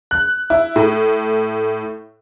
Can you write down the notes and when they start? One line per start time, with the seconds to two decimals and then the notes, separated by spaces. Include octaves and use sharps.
0.11 F#6
0.50 E4
0.76 A2